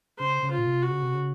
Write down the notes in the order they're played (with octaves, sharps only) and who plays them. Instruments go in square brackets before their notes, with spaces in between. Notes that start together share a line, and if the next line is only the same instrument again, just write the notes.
[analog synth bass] C#3 [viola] C5
[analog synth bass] C#3
[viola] F4
[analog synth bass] A#2
C3
[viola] F#4
[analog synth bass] C#3
C3
C#3